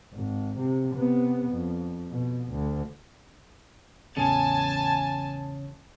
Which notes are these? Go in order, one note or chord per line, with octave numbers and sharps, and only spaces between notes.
G#1
C3
C3 B3
F2
B2
D2
A1 E2 C#3 G#5 A5